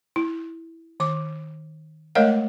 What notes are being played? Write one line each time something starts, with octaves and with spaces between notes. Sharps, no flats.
E4
D#3 D6
G#3 A3 A#4 C#5 D#5 F5